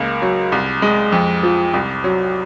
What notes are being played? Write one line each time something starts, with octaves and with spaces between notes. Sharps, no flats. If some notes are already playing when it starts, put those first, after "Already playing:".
Already playing: C#2 A#3
F#3
C2
G#3
F2
F3
C2
F#3